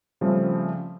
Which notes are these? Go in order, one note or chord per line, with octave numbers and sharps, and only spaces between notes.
C#3 F3 G3 A3 C4